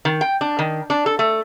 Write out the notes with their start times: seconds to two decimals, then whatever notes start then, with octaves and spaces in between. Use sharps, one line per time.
0.05 D#3
0.21 G5
0.41 D4
0.59 D#3
0.90 D4
1.06 A4
1.19 A3